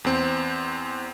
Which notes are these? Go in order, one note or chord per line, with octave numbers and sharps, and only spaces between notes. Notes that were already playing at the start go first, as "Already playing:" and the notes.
E2 C4